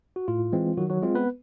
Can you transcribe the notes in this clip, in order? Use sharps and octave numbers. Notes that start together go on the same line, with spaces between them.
F#4
A2 F4
E3 G#3 C4
D#3 F#3 F#4
F#3 F#4
G#3 C4 F4
B3 B4